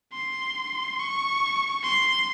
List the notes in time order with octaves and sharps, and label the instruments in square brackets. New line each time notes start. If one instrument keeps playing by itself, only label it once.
[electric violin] C6
C#6
C6